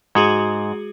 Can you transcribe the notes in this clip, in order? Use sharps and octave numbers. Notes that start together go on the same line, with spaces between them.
G#2 G#3 F#4 G#4